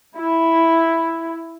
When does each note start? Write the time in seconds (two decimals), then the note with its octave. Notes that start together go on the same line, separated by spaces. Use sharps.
0.18 E4